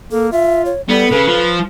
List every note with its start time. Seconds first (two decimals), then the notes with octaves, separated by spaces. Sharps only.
0.11 A#3 A4
0.32 F4 E5
0.65 C#5
0.89 G3 B3 A4
1.11 C#3 B4
1.27 F3